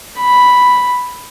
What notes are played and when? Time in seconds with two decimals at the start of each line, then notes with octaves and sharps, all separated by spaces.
0.19 B5